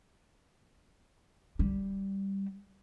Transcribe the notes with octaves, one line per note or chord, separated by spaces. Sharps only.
G3